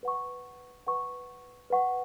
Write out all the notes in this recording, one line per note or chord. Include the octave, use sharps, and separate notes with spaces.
B4 F#5 C#6
B4 F#5 C#6
B4 F#5 C#6